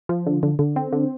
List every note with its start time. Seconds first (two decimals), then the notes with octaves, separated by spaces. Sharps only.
0.09 F3
0.26 D3
0.43 D3
0.59 D3
0.76 C4
0.92 D3